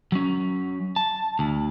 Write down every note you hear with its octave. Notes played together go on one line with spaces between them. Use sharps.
F#3 C#4
A5
D2